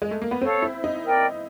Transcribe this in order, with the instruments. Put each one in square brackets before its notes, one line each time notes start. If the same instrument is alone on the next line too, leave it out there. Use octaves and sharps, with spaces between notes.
[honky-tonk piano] G#3
A3
A#3
B3
[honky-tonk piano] C4 [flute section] A4 C#5 F5
[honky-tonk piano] E4
D#4
[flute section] A#4 D5 G5